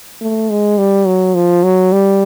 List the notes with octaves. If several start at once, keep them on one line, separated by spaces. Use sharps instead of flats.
A3
G#3
G3
F#3
F3
F#3
G3